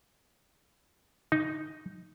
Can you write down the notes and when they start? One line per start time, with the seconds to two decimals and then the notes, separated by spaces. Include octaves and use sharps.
1.32 D#4